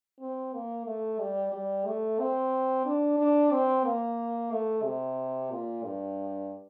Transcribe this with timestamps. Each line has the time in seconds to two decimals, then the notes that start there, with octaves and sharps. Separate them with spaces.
0.20 C4
0.54 A#3
0.87 A3
1.20 G3
1.52 G3
1.86 A3
2.19 C4
2.86 D4
3.18 D4
3.52 C4
3.85 A#3
4.51 A3
4.84 C3
5.51 A#2
5.84 G2